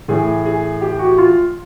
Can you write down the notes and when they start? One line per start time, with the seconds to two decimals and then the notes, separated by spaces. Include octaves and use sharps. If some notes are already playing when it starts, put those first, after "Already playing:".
0.08 A2 E3 G#4
0.45 G#4
0.81 G4
0.99 F#4
1.18 F4